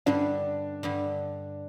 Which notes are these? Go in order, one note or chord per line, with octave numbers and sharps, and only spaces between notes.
G2 D3 G3 D4
G2 D3 G3